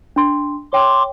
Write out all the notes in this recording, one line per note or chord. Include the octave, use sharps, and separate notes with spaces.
D4 C6
C#5 G5 C6 D6